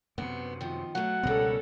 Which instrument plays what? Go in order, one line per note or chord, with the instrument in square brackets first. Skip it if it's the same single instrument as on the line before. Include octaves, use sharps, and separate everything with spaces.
[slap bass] F#2 C3 [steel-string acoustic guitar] B3
[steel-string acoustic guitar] D#3 F3
[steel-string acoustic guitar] F#3 A3 [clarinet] F#5
[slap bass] C#2 B2 B3 [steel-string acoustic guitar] G3 A#4 [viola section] C#4 A4